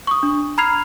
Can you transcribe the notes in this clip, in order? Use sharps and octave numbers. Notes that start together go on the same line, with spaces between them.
C#6 D#6
D4
A#5 B5 F6 G#6 C7 F7